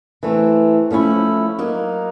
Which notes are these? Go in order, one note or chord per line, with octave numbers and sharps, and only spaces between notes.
E3 A3 C4
F3 A3 C#4 E4
F#3 A#3 D#4